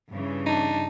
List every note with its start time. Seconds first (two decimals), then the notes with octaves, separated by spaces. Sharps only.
0.10 G2 C#3 E3
0.46 D4 D#4